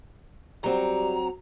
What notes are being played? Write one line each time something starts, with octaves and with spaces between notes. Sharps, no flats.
F#3 G3 C4 F#4 A#5